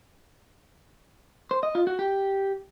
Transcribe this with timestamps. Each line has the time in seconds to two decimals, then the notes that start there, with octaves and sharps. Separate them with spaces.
1.51 C5
1.63 D#5
1.75 F4
1.87 F#4
1.99 G4